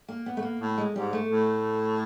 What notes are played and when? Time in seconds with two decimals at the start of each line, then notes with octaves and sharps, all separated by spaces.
0.08 A#3
0.26 B3
0.37 A3
0.43 A#3
0.60 A2
0.78 G#3
0.95 G#2 G3
1.13 A3
1.29 A2